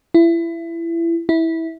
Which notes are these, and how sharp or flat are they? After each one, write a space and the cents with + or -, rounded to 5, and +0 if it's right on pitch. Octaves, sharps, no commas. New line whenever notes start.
E4 +25
E4 -15